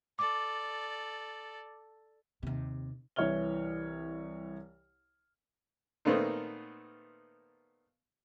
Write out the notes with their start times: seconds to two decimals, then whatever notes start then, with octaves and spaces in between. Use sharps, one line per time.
0.19 A4 D5 D6
2.43 D#2 C3
3.16 C2 E3 C#5 E5 F6 G7
6.05 A#2 D#3 A3 B3 C4